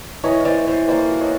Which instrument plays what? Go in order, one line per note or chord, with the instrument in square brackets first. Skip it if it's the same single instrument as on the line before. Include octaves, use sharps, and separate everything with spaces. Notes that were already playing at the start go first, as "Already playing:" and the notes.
[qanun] E3 [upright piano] C#5 D#5
[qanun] E3 [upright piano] C5 D5
[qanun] E3 [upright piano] C5
[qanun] A#3 [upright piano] C5 D5
[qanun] F#4
[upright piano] C#5 D#5